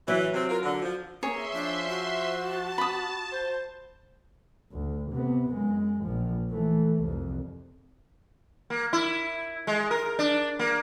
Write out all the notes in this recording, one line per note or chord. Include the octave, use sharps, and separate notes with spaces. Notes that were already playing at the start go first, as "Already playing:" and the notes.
E3 F#3
C3 C4
F4 A#4
D3
F3
A#3 G#4 C#5 E5 C6
F3 D4
F#4
A5
B5 D#6
C5
D2
C3 B3
F#2 G#3
A#1 F3
E3 A3
C2 F2
A#3
E4
G#3
A#4
D4
A#3